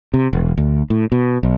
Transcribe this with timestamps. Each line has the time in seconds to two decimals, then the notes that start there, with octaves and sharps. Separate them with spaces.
0.14 C3
0.33 E1
0.58 D2
0.90 A2
1.12 B2
1.43 B1